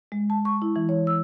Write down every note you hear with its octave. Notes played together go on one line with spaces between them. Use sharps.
G#3
A5
C#6
E4
E3
C#5
E6